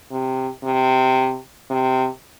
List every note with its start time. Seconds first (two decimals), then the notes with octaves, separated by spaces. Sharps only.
0.11 C3
0.64 C3
1.70 C3